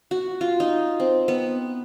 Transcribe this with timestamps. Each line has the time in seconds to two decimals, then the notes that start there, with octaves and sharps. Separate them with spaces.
0.11 F#4
0.41 F4
0.60 D#4
1.00 C4
1.28 B3